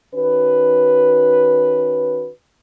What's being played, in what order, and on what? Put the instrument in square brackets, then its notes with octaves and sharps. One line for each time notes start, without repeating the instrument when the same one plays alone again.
[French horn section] D#3 C#4 F#4 B4